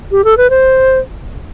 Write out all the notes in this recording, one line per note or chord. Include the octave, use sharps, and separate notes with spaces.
G4
A4
B4
C5